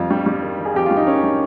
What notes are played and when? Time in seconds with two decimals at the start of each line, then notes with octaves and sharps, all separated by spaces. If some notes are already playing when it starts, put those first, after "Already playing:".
Already playing: F2 G3 F4
0.11 G3
0.26 G3
0.43 D#3
0.58 D#3
0.65 G#4
0.75 F2 G4
0.86 G3 F4
0.97 D#4
1.07 D#3 C#4
1.23 G3